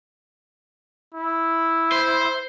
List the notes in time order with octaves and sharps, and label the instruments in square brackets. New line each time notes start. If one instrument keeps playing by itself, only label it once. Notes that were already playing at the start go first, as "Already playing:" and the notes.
[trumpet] E4
[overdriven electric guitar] C5